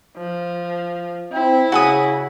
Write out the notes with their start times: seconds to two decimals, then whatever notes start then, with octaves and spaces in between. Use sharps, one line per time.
0.17 F3
1.32 C4 E4
1.72 C#3 F#4 G#5 D#6